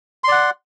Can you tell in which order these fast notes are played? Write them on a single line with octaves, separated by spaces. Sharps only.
C6 D5 F#5